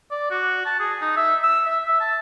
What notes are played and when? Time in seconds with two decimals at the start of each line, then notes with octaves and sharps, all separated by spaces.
0.11 D5
0.31 F#4
0.66 A5
0.80 G#4
1.01 D#4
1.17 E5
1.44 E6
1.66 E5
1.87 E5
2.01 A5